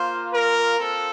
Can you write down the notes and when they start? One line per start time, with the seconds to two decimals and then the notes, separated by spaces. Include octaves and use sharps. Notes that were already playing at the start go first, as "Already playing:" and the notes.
Already playing: A#3 F4 C5
0.33 A#4
0.76 C4 F4 A4